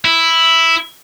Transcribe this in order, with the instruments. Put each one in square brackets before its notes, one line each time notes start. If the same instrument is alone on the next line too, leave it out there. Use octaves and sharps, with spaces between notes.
[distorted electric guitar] E4